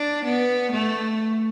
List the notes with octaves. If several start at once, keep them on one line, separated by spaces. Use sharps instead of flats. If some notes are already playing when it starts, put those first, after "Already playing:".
Already playing: D4
B3
A3